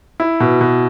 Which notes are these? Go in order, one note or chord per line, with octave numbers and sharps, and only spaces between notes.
E4
B2
B2